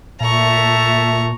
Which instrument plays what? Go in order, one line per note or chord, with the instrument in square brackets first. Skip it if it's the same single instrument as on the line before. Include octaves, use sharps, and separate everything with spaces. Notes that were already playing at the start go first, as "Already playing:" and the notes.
[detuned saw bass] A#2 [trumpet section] A3 E5 A5 [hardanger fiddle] A#5 C#6